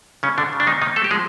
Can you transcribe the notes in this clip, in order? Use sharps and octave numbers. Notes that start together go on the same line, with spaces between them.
C#3 C#4
D3 D4
C#3
D4
D#3 D#4
D#3 A#3 D#4
A3 A4
G4
F3 G#3 G#4